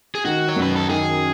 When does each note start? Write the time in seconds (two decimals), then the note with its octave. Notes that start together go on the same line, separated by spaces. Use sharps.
0.15 G#4
0.25 D#3 F#4
0.49 C#5
0.56 F#2
0.62 B4
0.76 A4
0.89 D#3 G#4